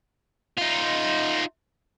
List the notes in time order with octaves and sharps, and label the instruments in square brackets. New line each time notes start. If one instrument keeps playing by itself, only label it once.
[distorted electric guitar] D#4 F4